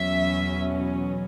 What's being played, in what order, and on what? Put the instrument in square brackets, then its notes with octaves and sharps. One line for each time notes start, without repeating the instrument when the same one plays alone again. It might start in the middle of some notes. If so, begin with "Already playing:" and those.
Already playing: [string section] E2 B2 F#3 C#4 E5